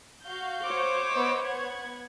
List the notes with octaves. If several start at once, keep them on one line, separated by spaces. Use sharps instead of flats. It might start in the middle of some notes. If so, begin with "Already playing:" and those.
F#4 F5 G6
C5 C#5 D6
B3 D#5 E6
B3 F#5 G#6